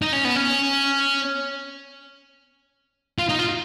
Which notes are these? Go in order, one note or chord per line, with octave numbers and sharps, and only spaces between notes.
D#4
C#4
B3
C#4
F4
D#4
F4